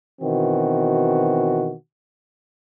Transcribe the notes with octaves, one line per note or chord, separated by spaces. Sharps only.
B2 D#3 E3 C4 F#4